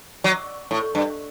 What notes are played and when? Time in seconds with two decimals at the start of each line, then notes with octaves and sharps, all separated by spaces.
0.24 F#3
0.71 A2
0.95 G2